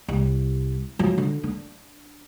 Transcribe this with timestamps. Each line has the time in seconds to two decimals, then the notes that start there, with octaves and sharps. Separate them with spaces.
0.08 C2
0.99 F3 F#3
1.18 D3
1.43 D4